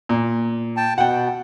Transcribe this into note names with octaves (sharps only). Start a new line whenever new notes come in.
A#2
G5 A5
B2 F#5 G5